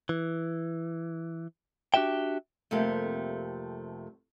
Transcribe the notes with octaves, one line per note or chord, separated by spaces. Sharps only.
E3
D4 F#4 G4 E5 G5
F2 C3 G3 A3 A#3